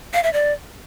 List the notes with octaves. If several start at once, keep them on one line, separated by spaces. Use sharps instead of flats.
F5
E5
D5